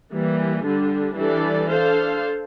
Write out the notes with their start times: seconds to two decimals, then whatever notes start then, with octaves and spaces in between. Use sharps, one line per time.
0.11 E3 G3 A#3
0.64 D3 G3 D4
1.16 E3 G3 D4 A4 D5
1.68 D4 A4 C5 F5